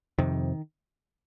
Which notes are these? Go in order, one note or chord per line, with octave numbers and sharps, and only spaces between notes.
F2 C3 D#3